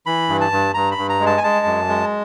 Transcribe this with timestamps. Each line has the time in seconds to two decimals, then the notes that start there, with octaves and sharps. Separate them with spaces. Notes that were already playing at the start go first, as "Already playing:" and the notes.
0.06 E3 B5
0.29 G2
0.41 A5
0.52 G2
0.74 G2 A#5
0.91 B5
0.98 G2
1.09 A#5
1.20 G#3
1.26 A5
1.37 G#5
1.44 G#3 A5
1.66 F#2
1.89 G#3